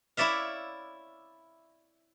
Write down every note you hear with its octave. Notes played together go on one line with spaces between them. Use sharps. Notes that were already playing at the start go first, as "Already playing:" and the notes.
E4 C#5 D5 E5 F5